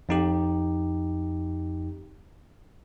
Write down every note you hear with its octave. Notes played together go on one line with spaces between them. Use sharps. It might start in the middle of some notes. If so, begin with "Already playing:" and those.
F2 D#4 G4